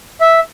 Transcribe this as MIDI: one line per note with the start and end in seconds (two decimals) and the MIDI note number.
0.21 0.40 76